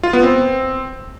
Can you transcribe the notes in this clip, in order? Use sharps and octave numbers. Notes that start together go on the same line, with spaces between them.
F4
B3
C4